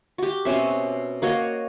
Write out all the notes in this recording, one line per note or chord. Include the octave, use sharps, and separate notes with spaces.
F#4 G4
B2 C4 C#4 E5
A#3 F#4 C#5 D#5